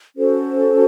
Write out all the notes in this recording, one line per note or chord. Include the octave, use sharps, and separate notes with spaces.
C#4 F#4 A4 C5